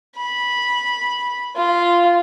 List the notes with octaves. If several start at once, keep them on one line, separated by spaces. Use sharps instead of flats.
B5
F4